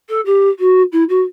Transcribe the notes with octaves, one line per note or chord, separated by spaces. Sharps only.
A4
G4
F#4
E4
F#4